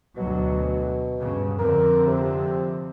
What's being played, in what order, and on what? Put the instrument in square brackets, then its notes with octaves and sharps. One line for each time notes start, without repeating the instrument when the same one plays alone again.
[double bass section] D2 F#3 [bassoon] B2
[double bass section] G2 C#3
[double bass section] F2 D3 C4 [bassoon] A#4
[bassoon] C3